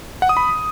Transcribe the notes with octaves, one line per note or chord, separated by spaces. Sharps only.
F#5
D#6
B5